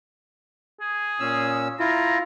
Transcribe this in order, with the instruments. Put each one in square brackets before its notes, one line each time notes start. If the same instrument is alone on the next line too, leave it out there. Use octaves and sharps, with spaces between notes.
[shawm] G#4
[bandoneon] A#2 C#4 E6
[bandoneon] E4 F4 [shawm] A#5